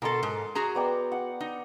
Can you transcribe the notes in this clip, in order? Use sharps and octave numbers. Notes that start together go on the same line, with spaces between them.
B2 A4 A#4 C6
G#2
F#4 G#4 A#5
B3 D5 G5
F#5
D#4